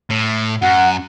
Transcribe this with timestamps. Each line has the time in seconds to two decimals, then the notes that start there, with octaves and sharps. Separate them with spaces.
0.10 A2
0.62 F#2 F#5